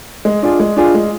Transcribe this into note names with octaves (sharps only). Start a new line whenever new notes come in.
G#3
D4 F4 G#4
G#3
D4 F4 G#4
G#3